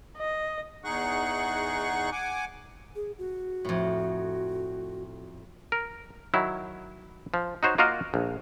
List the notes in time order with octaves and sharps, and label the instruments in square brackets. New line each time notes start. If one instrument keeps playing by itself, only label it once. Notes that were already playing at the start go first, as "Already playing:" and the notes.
[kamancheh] D#5
[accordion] E2 D#4 G#4 F#5 C#6 F#6
F#5 G#5 D6
[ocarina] G#4
F#4
[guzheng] F2 A2
[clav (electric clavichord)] A#4
D#3 F#3 E4
F3
D#4 F#4 C5 C#5
A#3 F4 F#4 A#4 D#5 F5
A#1